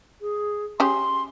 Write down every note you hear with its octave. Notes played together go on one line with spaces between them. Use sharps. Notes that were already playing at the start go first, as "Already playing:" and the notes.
G#4
C#4 G4 G#4 C6